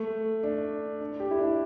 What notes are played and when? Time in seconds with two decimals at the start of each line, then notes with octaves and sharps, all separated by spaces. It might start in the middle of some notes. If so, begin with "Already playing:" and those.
Already playing: A3
0.43 D4
1.01 D4
1.20 G4
1.31 E4
1.38 D4